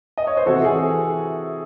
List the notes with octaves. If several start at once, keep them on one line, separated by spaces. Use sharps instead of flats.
D#5
C#5
C5
C3 E3 F#4 A4
G#4